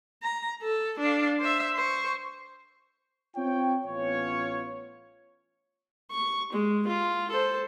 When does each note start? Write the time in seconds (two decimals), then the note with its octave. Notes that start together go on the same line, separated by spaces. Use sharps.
0.23 A#5
0.62 A4
1.00 D4 F5
1.40 C5 E5
1.75 C5 C#6
3.36 C4 F4 C#5 G5
3.86 A1 B3 C#4 F4 C#5
6.11 C#6
6.53 G#3
6.87 F4
7.30 A4 C5